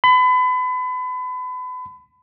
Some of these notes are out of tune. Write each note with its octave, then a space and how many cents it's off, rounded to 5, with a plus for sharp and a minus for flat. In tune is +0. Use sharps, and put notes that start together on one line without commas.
B5 +35